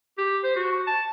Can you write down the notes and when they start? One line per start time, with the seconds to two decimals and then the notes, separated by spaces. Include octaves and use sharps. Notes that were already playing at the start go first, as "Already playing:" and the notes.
0.18 G4
0.43 C5
0.56 F#4
0.87 A5